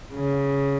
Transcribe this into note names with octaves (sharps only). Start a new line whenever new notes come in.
C#3